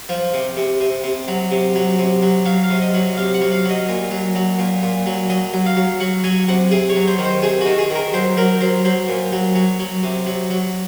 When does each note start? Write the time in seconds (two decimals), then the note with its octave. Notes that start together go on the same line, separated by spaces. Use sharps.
0.09 F3
0.33 C3
0.57 C3
0.80 C3
1.04 C3
1.28 F#3
1.51 C3
1.75 F#3
1.99 C3
2.22 F#3
2.45 F#3 F5
2.63 F5
2.70 C3
2.81 D#5
2.94 F#3
3.17 C3 F5
3.34 F#5
3.41 F#3
3.52 F5
3.64 F#3
3.70 D#5
3.88 A#2
4.11 F#3
4.35 F#3
4.59 A#2
4.83 A#2
5.06 F#3
5.29 F#3 D#5
5.53 F#3
5.66 F5
5.76 F#3
6.00 F#3 F#5
6.24 F#3 G#5
6.48 C3 F#5
6.71 C3 G#4
6.89 C#5
6.96 F#3
7.08 C5
7.19 D#3
7.25 C5
7.42 C3 G#4
7.61 D#3 F#4
7.78 G#4
7.90 D#3 A#4
8.13 F#3 C5
8.37 F#3 A#4
8.61 F#3 C5
8.85 F#3 C5
9.08 A#2
9.32 F#3
9.55 F#3
9.79 F#3
10.03 C3
10.26 F#3
10.50 F#3